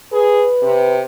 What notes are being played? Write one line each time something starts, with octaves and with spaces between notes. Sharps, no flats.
G#4 B4
C3